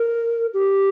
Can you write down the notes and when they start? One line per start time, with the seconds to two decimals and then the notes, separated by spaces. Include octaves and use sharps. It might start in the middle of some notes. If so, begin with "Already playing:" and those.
Already playing: A#4
0.54 G4